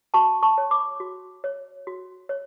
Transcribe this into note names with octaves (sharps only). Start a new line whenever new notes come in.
F#4 A5 C#6
A5 C#6
C#5
B5 D6
F#4
C#5
F#4
C#5